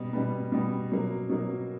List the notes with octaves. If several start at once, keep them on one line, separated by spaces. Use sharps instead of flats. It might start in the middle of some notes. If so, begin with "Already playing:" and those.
Already playing: B2 G3 B3
B2 G3 B3
B2 G3 B3
B2 F#3 A#3
B2 F#3 A#3